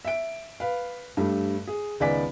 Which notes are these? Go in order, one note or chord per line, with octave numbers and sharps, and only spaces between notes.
E5 D7
B4 F5
G2 G3 A3
G#4
C#2 D#3 B3 D5 G#5 B6